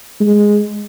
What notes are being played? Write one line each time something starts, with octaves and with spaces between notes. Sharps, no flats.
G#3